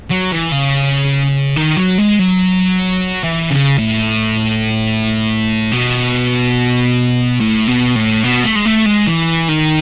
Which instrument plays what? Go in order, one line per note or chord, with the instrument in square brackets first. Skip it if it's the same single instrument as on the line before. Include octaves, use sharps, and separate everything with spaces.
[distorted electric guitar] F#3
E3
C#3
D#3
F#3
G#3
F#3
E3
C#3
A2
B2
A2
B2
A2
B2
A3
G#3
A3
G#3
E3
D#3